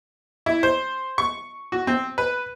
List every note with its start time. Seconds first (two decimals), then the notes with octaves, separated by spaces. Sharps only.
0.46 E4
0.63 C5
1.18 C#6
1.72 F#4
1.87 C4
2.18 B4